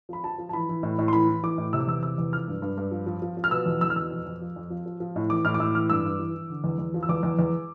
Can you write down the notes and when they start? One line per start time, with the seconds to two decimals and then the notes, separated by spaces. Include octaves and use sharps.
0.09 F3 B5
0.24 F3 A5
0.38 F3
0.49 A5
0.53 E3 B5
0.69 E3
0.83 A2
0.98 A2
1.08 C6
1.13 E3 B5
1.28 E3
1.43 E3 D6
1.58 A2
1.73 C3 E6
1.80 D6
1.87 E2 E6
2.03 C3 E6
2.18 E2
2.32 F3 F6
2.48 G2
2.62 G2
2.77 G2
2.91 F3
3.06 F3
3.22 F3
3.37 F3
3.44 F6
3.51 B2 E6
3.66 E2
3.81 E2 E6
3.90 F6
3.96 B2 E6
4.11 F2
4.26 F2
4.41 F3
4.56 F2
4.70 F3
4.86 F3
5.00 F3
5.16 A2
5.30 E3 D6
5.45 A2 F6
5.54 D6
5.60 A2 E6
5.75 E3 F6
5.90 G2 E6
6.05 G2
6.19 E3
6.35 E3
6.50 D3
6.64 E2
6.79 E2
6.94 F3
7.03 E6
7.09 E2 D6
7.23 E2
7.39 E2